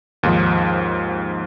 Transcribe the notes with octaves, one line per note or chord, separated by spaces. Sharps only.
D#2 G#2 F3